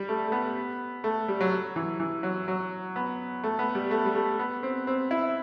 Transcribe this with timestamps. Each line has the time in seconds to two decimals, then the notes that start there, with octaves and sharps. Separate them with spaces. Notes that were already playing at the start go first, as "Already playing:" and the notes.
Already playing: G3
0.09 A3
0.27 A3
0.32 B3
1.04 A3
1.28 G3
1.41 F#3
1.76 E3
2.00 E3
2.23 F#3
2.48 F#3
2.96 B3
3.44 A3
3.59 B3
3.75 G3
3.91 A3
4.05 G3
4.15 A3
4.39 B3
4.63 C4
4.87 C4
5.11 E4